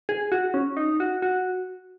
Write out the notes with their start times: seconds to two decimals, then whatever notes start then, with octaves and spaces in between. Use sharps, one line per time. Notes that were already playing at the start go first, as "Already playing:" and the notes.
0.09 G#4
0.32 F#4
0.54 C#4
0.77 D#4
1.00 F#4
1.22 F#4